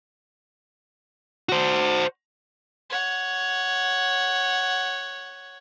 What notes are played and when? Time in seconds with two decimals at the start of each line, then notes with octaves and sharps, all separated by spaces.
1.49 F#4 C5
2.90 C#5 F#5